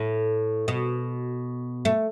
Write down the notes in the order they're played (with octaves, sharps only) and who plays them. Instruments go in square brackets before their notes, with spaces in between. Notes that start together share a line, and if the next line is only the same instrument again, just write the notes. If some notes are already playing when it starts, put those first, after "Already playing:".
Already playing: [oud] A2
B2
A3